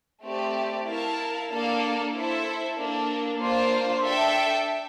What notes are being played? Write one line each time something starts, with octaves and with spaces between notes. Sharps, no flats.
A3 C4 G4 D5
E4 A#4 F5 A5
A#3 D4 A4 D5 F5
E4 A4 C5 E5
A#3 D4 A4
A#3 D4 F4 C5
D4 A4 E5 G5